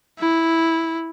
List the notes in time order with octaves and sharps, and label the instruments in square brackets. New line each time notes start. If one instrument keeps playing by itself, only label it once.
[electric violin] E4